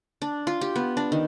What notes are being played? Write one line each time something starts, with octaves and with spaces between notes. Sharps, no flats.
D4
F4
G4
B3
D4
D#3